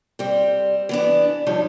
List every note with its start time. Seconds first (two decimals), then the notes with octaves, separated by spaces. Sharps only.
0.19 G3 C4
0.89 E3 B3 D4
1.46 G2 F3 G3 D#4 C#5